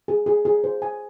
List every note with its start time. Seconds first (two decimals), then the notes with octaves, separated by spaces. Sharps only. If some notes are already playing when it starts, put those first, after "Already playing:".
0.08 G#4
0.26 G#4
0.45 G#4
0.64 C5
0.82 G#5